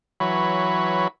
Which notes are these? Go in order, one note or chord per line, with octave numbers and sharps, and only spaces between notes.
E3 F#3 B4 C#5 B5